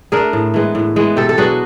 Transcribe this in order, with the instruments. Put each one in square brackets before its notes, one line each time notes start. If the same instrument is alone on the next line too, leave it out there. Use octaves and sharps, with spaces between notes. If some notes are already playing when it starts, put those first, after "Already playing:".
[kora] A3 D4 G#4 A#4
A2
E3 G#3 B3
A2
E3 G#3 B3
B2 G4 A4
A4
F#3 B3 D4 F#4 G#4